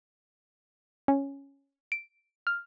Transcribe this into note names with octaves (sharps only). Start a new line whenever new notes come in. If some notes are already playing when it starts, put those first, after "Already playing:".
C#4
D7
F6